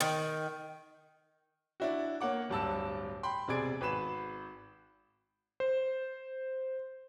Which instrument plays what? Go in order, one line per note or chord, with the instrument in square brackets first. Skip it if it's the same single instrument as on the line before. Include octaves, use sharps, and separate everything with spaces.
[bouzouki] D#3
[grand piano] D4 E4 F#4
A#3 C#5 F#5 D6
D1 G2 A5 E6
G5 B5 C6
E1 C3 G#4 D5 G#6 D7
G#1 B4 B5 E7
[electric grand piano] C5